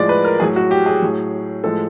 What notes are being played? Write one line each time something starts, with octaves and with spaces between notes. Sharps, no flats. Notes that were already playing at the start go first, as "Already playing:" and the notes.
Already playing: A2 F3 G#3 D5
B4
A#4
A2 F#3 G#4
F#4
G4
G#4
A2 F#3
A2 F3 G#3 A4